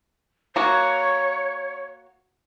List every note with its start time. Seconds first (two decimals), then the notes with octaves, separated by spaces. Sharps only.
0.56 A#3 F#4 C#5